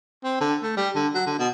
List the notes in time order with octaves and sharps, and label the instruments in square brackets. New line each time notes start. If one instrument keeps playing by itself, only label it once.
[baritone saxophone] C4
D3
A3
G3
D3
F#3
D3
B2